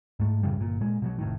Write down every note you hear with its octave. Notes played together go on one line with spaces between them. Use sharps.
G#2 A3
F#2 A2 C#3 G3
G1 A#2
A#2 G#3
B2 F3 F#3
F1 A2 D#3